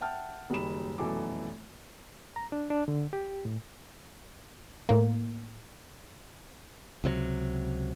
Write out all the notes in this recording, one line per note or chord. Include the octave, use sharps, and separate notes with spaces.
E5 F#5 G5 A5 F6
F#1 F#2 D#3 G3 B5 E7
F1 F#2 B2 E3 A4 D6
A#5
D4
D4
D3
G4
A2
A2 A#3
C#2 C3 F3 F#3